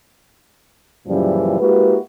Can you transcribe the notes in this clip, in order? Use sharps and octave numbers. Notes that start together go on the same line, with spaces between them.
F#2 A#2 C#3 E3 F3 G3
G#3 A#3 E4 F#4 G4 B4